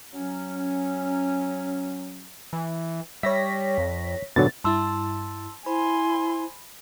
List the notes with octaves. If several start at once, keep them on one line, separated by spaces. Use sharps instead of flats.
F#3 C#4
E3
G3 C#5 E5 A#6 B6
F2
G#2 B2 D3 F#3 A6
G2 E4 A5 C6 E6 A6
E4 C5 G#5 B5 C6